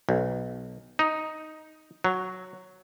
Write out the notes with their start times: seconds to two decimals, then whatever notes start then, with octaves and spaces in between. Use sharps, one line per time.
0.09 B1
0.99 D#4
2.04 F#3